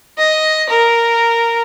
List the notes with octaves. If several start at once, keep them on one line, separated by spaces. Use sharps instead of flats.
D#5
A#4